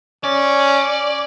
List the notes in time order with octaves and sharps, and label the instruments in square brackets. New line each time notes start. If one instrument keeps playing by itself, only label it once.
[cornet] C#4 [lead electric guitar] D5